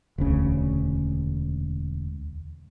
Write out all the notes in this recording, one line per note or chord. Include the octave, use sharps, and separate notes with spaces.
E1 D2 C#3